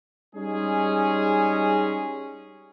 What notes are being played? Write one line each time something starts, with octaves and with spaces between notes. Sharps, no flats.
G3 G#3 C#4 D#4 G#4